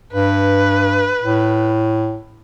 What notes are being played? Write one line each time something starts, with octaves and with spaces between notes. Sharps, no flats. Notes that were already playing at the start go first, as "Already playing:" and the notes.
G2 B4
A2